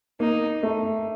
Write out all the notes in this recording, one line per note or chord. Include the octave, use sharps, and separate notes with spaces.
A#3 D#4
A3